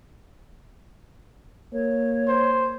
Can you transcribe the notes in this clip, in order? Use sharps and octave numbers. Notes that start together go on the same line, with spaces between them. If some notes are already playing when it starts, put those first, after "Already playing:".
A#3 C#5
C5